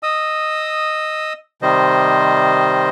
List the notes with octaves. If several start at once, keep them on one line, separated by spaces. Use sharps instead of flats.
D#5 D#6 E6
C3 D#3 G3 C5 D#5